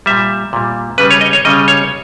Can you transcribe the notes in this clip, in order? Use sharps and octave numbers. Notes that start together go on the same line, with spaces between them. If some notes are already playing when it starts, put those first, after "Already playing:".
A#2 G3 E5
A#2 G3
C#3 G3 B4
C#5
D#5
C#5
C#3 G3 D#5
C#5